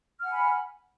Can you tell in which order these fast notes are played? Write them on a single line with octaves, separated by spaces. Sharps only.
F6 F#5 G#5 B5